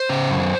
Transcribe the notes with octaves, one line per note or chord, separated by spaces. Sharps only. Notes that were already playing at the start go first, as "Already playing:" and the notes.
Already playing: C5
C#3
F#2